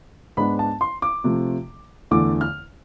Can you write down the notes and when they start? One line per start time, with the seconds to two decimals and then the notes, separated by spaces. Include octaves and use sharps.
0.37 G#2 G#3 B3 D4 B5
0.59 A5
0.81 C6
1.02 D6
1.24 C3 F3 A3
2.11 E2 D3 A3 E4 D6
2.41 F6